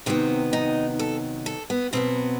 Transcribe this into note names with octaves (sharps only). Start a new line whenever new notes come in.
C3 D#3 F#3 B3 C4
D#4
A4
A4
B3
B2 F#3 B3 C4